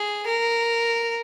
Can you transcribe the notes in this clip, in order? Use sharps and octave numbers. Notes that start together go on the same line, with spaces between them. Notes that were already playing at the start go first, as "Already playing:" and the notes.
Already playing: G#4
A#4